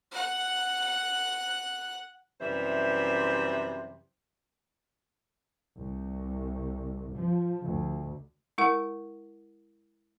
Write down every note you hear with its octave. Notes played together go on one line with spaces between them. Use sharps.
F#5 F#6
F#2 C3 E3 G3 C5 E5
C2
F3
D2
G#3 E4 A#4 F#5